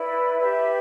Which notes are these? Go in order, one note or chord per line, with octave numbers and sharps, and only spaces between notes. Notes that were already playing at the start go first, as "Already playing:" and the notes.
Already playing: E4 B4 D5
G4 B4 E5